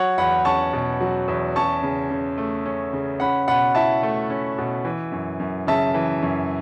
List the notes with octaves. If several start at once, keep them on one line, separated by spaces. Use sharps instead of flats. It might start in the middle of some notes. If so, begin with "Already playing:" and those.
Already playing: F#3 C#5 F#5
E2 F#5 B5
C#4 A5 C#6
B2
F#3
E2
C#4 A5 C#6
C#3
C#3
A3
C#4
C#3
C#4 F#5 B5
B2 F#5 B5
E4 E5 A5
A3
C#4
B2
E3
F#2
F#2
C#3 E5 A5
E3
F#2